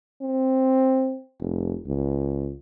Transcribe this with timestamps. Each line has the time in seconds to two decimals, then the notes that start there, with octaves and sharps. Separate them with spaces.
0.22 C4
1.40 F1
1.87 C#2